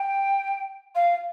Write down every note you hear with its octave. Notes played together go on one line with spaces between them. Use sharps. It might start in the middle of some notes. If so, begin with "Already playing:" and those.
Already playing: G5
F5